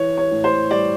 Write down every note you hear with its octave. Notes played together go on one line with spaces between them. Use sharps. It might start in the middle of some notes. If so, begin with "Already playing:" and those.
Already playing: E3 C#5
C#5
A2
C5
G3 D5